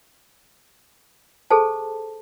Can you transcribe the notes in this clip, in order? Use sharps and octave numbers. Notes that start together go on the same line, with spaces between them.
G#4 A4 C5 A5